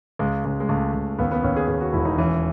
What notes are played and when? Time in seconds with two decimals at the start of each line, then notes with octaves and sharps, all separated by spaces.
0.19 C#2 G#3
0.44 C#2 G#3
0.60 G#3
0.69 C#2 A3
0.94 C#2
1.19 D#2 B3
1.31 B3
1.44 D#2 C#4
1.56 G#4
1.68 D#2 G#4
1.81 F#4
1.93 E1 E4
2.05 D#4
2.18 E3 C#4